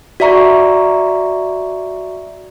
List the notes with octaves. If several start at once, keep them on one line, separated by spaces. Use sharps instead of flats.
F#4 D5 E5 A#5 C#6